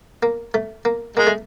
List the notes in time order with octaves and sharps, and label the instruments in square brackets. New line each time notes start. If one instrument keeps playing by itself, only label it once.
[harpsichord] A#3
A3
A#3
[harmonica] G#3 [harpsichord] A#3
[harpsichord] A3